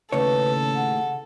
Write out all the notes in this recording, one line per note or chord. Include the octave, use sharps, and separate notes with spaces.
D#2 A2 C#3 A4 B4 C#5
F#5